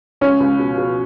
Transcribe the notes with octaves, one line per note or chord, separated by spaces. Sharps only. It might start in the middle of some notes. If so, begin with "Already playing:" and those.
C#2 C#4
C#2
B2
B2